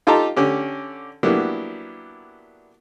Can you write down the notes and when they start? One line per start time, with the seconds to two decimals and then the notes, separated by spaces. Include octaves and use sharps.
0.07 D#4 F4 G4 A4 A5 A#5
0.36 D3 C#4 G4
1.23 F#3 A#3 B3 D4 E4 G4